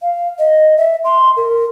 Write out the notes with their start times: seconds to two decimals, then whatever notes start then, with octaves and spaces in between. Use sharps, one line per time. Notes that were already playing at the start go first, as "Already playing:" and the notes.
0.02 F5
0.39 D#5
0.77 E5
1.04 C6
1.37 A#4